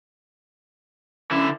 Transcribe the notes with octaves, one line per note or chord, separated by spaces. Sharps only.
D3 C#4 E4